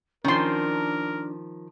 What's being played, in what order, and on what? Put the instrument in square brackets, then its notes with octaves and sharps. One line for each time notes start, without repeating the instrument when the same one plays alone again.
[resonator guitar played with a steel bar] D#3 F3 [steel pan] C#4 C6 [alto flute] D4 [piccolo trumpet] A#4